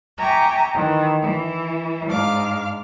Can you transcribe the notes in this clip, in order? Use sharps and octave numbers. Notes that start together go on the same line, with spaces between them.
E5 G5 G#5 A#5 C#6 D6
D#3 E3
E3
G#2 D4 F5 D6 F6